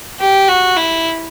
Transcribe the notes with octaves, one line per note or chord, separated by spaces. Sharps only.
G4
F#4
E4